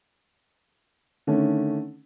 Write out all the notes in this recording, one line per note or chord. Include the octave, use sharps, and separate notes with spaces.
D3 D#3 A3 C#4